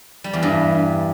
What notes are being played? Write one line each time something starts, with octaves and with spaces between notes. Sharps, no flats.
G3
E2
G2